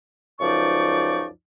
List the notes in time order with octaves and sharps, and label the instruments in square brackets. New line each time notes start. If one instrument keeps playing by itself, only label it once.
[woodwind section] C#2 F#2 F3 D#4 D5 C#6